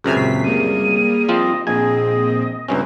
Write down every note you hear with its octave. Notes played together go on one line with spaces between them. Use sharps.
C#2 F#2 C3 G#4 B4 G#5
A#2 C#3 C#4 B6 C7
G3 A#3 G#4 A#4 D#7
F3 C4 F4 D#5
A#1 A#2 C4 G#4 D#5 G#5
C#2 G2 C4 C#4 E4